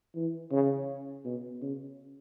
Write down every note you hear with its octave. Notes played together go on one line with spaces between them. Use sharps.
E3
C#3
B2
C#3